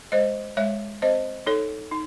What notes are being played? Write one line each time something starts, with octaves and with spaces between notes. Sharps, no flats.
G#3 C5 D#5
G#3 C#5 E5
C4 C5 D#5
D#4 A4 C#5
D#4